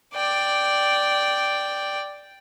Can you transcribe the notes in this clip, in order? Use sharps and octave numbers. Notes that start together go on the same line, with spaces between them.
D5 G5